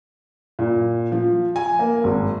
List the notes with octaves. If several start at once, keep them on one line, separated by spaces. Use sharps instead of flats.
A#2
F3
G#5
A#3
G#1